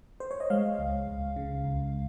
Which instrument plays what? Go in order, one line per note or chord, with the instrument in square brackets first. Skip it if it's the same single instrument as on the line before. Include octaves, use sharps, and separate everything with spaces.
[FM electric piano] C5
C#5
D#5
G#3 F5
C#2
C#2
C#3
C#2